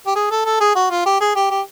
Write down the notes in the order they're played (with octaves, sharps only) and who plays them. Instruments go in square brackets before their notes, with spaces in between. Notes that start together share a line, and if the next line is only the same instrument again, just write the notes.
[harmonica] G4
G#4
A4
A4
G#4
F#4
F4
G4
G#4
G4
G4